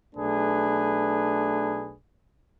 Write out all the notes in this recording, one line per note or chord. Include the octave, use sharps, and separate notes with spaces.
B1 A3 D4 G#4 B4